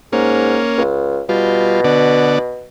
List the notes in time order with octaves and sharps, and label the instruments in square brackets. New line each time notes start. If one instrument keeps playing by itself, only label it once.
[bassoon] G#2 [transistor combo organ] A#3 C#4
[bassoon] C#2
[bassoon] B2 [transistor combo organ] G3 F4
[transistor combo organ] D3 B3 D5